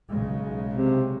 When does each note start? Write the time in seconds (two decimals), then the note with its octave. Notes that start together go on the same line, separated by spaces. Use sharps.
0.10 B1 C#3 G#3
0.74 C3